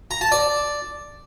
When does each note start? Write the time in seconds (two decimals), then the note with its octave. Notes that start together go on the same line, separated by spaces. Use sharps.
0.11 A#5
0.21 A5
0.32 D5